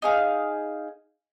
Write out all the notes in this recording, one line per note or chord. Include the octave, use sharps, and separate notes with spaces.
D#4 G#4 F5